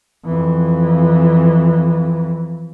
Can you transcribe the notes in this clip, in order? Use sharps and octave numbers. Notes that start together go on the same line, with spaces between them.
F2 E3